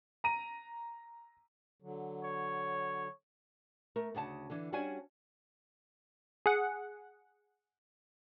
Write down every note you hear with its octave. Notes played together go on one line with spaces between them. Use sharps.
A#5 D#7
D3 F#3
C#5
A3 A#4
D2 C#3 F#5 A5
D3 E3
G3 C#4 D4 F#4 F#5 G#5
G#4 F#5